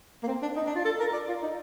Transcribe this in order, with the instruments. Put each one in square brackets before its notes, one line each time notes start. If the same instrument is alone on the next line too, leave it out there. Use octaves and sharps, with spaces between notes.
[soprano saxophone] A#3
C4
D4
D#4
D4
F4
A4
A#4
D5
F4
D#4